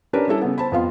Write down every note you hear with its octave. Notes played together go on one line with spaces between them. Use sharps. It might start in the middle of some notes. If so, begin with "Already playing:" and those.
C#4 D4 G4 A#4 B4
G3 C#4 E4 A4
C#3 B3
C5 A5 B5
F2 B3 F4 F5